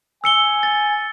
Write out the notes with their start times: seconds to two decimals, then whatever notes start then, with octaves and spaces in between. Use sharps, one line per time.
0.24 G#5 E6 C#7 G7
0.63 A6